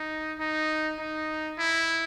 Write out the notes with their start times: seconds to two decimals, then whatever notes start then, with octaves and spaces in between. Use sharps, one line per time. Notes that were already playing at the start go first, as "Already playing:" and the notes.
Already playing: D#4
0.39 D#4
0.99 D#4
1.58 E4